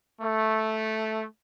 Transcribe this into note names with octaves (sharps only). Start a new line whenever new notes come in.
A3